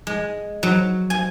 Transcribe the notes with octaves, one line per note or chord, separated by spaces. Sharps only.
G#3
F#3
G#5